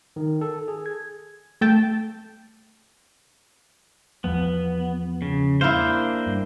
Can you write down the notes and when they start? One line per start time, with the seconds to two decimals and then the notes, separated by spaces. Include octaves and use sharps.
0.16 D#3
0.41 A4
0.68 G#4
0.86 G#6
1.61 A3 G5 A5
4.24 E2 F3 B3
5.22 C#3
5.61 A#3 D4 E4 C5 F5
6.27 G2